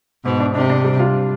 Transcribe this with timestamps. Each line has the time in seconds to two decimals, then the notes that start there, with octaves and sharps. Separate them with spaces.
0.25 G#2 B2
0.40 D4
0.55 C3 D4
0.70 D4
0.84 G3
0.99 F4